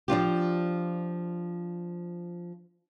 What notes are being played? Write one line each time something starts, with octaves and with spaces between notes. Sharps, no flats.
F3 D4 F4 G4